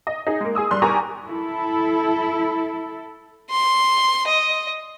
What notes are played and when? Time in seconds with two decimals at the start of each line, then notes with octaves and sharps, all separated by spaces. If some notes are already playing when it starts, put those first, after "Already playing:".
0.07 D#5
0.27 D#4 G#4
0.41 G#3 A#3
0.55 G#4 G#5 D#6 E6
0.71 G3 C6 D#6 F#6
0.82 G4 A#4 D5 G#5 A#5 C#6
1.26 E4 A4
3.51 C6
4.28 D#5